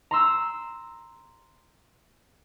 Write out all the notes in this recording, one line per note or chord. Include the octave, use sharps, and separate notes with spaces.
A#5 C6 E6